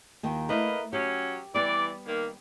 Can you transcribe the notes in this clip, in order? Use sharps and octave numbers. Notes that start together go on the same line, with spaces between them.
D#2 D#3 F4
A3 A#3 E4 A#4 B4 D#5
F#3 C#4 G4
E3 G3 B3 D5
D#3 A#3